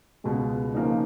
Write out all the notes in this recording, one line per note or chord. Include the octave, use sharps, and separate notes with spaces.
C#2 B2 G#3
C#3 F3 A#3 D#4